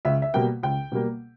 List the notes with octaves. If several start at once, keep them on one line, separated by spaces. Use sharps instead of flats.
C#2 E5
E5
B2 G3 A#3 G5
C#2 G5
B2 G3 A#3